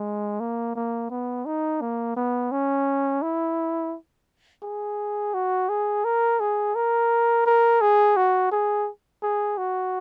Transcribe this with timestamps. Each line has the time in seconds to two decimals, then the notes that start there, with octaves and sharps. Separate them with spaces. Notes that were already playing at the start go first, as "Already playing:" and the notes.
Already playing: G#3
0.40 A#3
0.75 A#3
1.10 B3
1.46 D#4
1.81 A#3
2.17 B3
2.52 C#4
3.22 E4
4.63 G#4
5.34 F#4
5.69 G#4
6.05 A#4
6.40 G#4
6.75 A#4
7.46 A#4
7.81 G#4
8.17 F#4
8.52 G#4
9.22 G#4
9.58 F#4